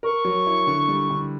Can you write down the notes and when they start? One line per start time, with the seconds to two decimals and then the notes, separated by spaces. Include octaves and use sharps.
0.03 A#4 C#6
0.25 F#3
0.47 E4
0.67 D3
0.88 G3
1.10 D3